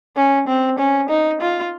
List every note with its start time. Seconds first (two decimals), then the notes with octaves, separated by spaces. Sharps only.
0.16 C#4
0.47 C4
0.79 C#4
1.09 D#4
1.41 F4